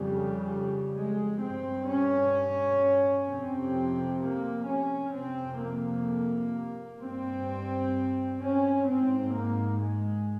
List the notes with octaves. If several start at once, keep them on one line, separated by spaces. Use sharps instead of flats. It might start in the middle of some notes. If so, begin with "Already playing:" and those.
Already playing: F2 C#3 G3
G#3
G2 C4
C#4
F2 C3 C4
A#3
C#4
F2 C3 C4
A#3
G2 C4
C#4
G#2 C4
A#3
G#3